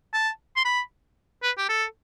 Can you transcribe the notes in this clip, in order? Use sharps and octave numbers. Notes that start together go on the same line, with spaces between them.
A5
C6
B5
B4
G4
A4